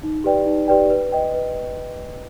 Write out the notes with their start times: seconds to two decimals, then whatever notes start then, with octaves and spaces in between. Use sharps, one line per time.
0.03 D#4
0.24 G4 B4 D5 G5
0.46 D#4
0.68 G4 B4 D5 G5
0.90 B4
1.12 D#5 G5
1.34 B4